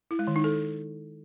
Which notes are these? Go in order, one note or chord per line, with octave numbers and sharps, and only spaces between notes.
E4
G#3
D#3
D#4
A4